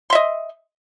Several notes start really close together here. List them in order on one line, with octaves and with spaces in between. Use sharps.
C6 E5 D#5